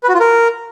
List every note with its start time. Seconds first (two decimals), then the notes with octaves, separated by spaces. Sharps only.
0.03 B4
0.09 F#4
0.14 F4
0.20 A#4